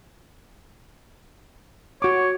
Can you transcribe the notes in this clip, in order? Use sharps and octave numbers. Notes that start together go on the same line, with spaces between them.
F#4 C#5 D6